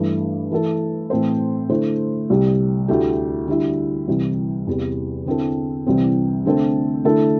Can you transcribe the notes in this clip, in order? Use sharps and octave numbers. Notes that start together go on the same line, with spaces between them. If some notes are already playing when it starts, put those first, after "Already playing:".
Already playing: G2 E3 A3 D4
E3 A3 E4 A4
A2 E3 C4 A4 C5
D3 A3 E4 C5
C2 C3 G3
D2 D3 A3 E4 G4
D3 G3 E4
C2 C3 E3
E2 C3 G3
D3 C4 E4 A4
C2 C3 E3 C4
D3 A3 C4 A4
D3 A3 E4 A4